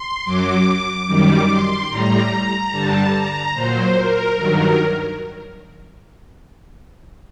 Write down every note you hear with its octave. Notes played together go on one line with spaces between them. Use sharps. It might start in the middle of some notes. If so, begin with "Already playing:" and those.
Already playing: C6
F#2 F#3 D6
F#2 D#3 G3 D6
C6
A2 G3 A#5
G2 D3 G3 A5
A#5
A#2 F#3 C5
A#4
G2 D#3 F#3 A#4